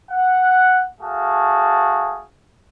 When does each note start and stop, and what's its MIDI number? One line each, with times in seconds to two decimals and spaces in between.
0.11 0.85 78
1.01 2.23 57
1.01 2.23 66
1.01 2.23 68
1.01 2.23 77
1.01 2.23 81